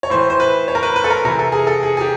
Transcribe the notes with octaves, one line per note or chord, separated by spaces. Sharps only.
C#5
A2 E3 C5
C5
B4
C#5
A#4
B4
B4
A4
A#4
C3 E3 A#4
A4
G#4
A4
G#4
G#4
G4